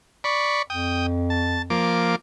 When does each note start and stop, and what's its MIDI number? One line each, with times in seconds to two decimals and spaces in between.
0.24 0.62 74
0.24 0.62 83
0.24 0.62 85
0.70 1.82 41
0.70 1.06 79
0.70 1.06 87
1.30 1.62 81
1.70 2.16 53
1.70 2.16 58
1.70 2.16 86